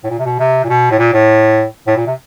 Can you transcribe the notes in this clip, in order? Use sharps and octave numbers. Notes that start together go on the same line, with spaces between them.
A2
A#2
C3
B2
C3
A#2
B2
A2
A#2
A2
A2
A#2
C3